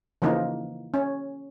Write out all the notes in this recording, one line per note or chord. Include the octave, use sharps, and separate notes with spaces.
C#3 E3 F3 A#3 D#4
C#4